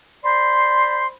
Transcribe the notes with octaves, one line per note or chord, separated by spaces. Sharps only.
C5 D5 B5 C6